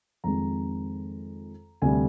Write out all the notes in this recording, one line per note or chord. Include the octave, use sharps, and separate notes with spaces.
F2 D#3 G#3 C4 A#5
D2 C3 G3 G#5